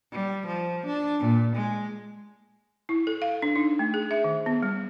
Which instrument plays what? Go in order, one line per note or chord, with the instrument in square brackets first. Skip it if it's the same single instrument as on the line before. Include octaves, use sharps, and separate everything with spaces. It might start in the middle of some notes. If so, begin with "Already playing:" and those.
[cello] G3
F3
D4
A#2
G#3
[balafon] E4
A4
F5
D4
D#4
A3
G#4
E5
D#3
B3
G3